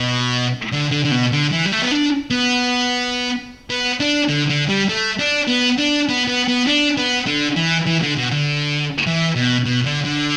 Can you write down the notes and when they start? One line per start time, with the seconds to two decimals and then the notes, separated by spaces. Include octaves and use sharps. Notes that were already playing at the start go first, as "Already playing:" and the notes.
Already playing: B2
0.72 D3
0.91 D3
1.05 D3
1.11 B2
1.32 D3
1.52 E3
1.66 G3
1.72 A3
1.82 B3
1.91 D4
2.31 B3
3.70 B3
4.00 D4
4.29 D3
4.50 D3
4.69 G3
4.89 A3
5.19 D4
5.48 B3
5.78 D4
6.09 B3
6.28 B3
6.48 B3
6.67 D4
6.97 B3
7.27 D3
7.56 E3
7.87 E3
8.02 D3
8.17 B2
8.31 D3
9.07 E3
9.36 B2
9.65 B2
9.86 D3
10.05 D3